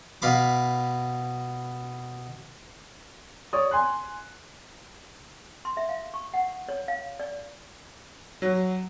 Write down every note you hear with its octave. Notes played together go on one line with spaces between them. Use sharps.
B2 F5 B5 D6
C#5 D5 D#6
G#5 C6 F#6
C6
E5
F5
C#6
F#5
C#5
F5
D5
F#3